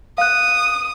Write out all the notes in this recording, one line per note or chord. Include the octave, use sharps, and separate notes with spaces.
F5 D#6 F#6